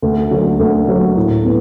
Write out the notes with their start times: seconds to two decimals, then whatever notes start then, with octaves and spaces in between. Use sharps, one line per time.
0.02 D2
0.31 D3 F#3 A#3
0.60 D2
0.87 D3 F#3 A#3
1.16 A2
1.45 B3